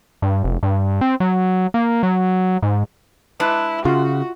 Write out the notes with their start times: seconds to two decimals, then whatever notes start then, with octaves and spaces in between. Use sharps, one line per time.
0.22 G2
0.44 F1
0.63 G2
1.01 C4
1.20 F#3
1.74 A#3
2.03 F#3
2.62 G#2
3.40 G#3 D4 E4 B4
3.85 C#3 F4 F#4